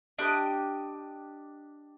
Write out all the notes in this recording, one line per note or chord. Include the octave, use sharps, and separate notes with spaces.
D4 G4 C5 D#5